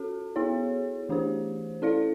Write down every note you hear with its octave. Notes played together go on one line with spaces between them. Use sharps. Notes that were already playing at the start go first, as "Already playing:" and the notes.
Already playing: C#4 F#4 A4
B3 E4 G#4 C#5
E3 A3 D4 G4 C5
C#4 E4 A4 D5 F5